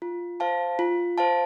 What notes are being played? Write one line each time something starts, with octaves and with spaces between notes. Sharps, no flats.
F4
C5 F5 A5
F4
C5 F5 A5